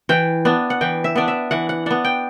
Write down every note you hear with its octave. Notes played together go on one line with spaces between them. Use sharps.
E3 G5
B3 D4
F#5
E3 G5
E5
B3 D4 D5
E5
E3 F#5
F#5
B3 D4 F#5
G5